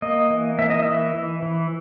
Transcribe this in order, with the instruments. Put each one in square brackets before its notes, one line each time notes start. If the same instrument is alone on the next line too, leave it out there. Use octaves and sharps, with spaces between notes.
[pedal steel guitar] A#3 D#5
E3
A#3 E5
D#5
E3 E5
E3
E3